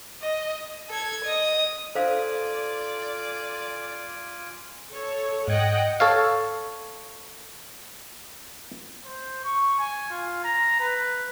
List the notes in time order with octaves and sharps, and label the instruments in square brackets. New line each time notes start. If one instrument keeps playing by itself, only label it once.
[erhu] D#5
[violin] A4 G#6
D#5 D#6
[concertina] F4 G#5 D6 [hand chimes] A4 [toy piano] C5 F5 [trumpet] D5
[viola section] A4 C#5
[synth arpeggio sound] G#2 G#6 C#7 [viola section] D#5 F#5 G5
[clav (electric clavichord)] A4 C#5 F5
[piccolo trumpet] C5
C#6
G#5
F4
A#5
B4